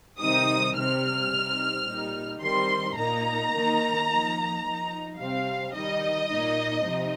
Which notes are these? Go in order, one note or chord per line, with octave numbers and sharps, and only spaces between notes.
C3 D#3 G3 C4 D#4 D#6
C3 G3 C4 F6
C3 G3 C4 D#4
A#2 G3 D#4
D#3 G3 C4 C6
A#2 A#3 D#4 A#5
D#3 A#3 D#4
F3 A#3 D#4
F3 D#4
C3 G3 C4 F5
D#3 G3 D#4 D#5
A#2 A#3 D#4
C3 F3 C4 D#4